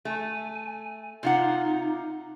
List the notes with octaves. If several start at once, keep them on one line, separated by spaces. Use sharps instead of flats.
A3 G#5
C3 D#4 F4 F#5